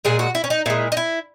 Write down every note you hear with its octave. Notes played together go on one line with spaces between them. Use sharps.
A#2 G#3 G#4
F#4
E4
C#4
D#4
A#2 G#3 E4
D#4
E4